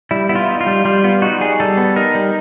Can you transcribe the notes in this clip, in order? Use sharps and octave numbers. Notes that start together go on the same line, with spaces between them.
G3 E4
B3 E4
F4
D#4
F4
G3
G3 F4
B3 F4
D#4 F#4
G3 G#4
G3 A4
B3
D#4 A#4
G3